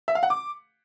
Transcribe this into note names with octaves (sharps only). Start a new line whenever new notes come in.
E5
F5
F#5
D6